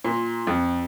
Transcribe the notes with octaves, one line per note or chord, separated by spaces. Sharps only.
A#2
F2